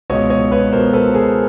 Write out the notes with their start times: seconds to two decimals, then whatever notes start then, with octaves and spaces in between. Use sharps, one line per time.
0.10 C#2 B2 C#5 D#5
0.30 C#5 D#5
0.51 B4 C#5
0.72 C#2 B2 A#4 C5
0.93 A4 B4
1.14 G#4 A#4